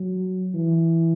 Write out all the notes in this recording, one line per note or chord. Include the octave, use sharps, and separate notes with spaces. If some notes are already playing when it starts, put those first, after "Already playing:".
Already playing: F#3
E3